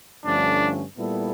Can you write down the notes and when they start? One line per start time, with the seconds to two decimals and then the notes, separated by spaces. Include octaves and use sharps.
0.25 G2 D3 F3 A3 C#4 D4
0.97 A#2 G3 B3 E4 A4